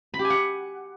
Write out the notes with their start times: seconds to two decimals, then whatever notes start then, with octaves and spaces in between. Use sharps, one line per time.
0.14 B5
0.19 G4
0.25 G#5
0.30 F#5